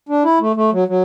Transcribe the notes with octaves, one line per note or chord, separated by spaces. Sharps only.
D4
E4
A3
A3
F#3
F#3